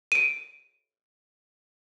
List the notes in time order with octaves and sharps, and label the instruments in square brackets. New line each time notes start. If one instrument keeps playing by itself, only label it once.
[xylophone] D7 D#7